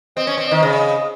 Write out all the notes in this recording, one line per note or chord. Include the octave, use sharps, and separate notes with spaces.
C4 D#5
C#4
C4
D#3 D#5
C#3
D#5